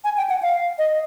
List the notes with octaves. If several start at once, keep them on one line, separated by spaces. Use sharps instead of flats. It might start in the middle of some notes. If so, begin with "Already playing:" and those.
G#5
G5
F#5
F5
D#5